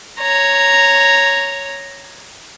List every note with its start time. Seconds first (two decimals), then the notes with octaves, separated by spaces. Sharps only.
0.19 C#5 A#5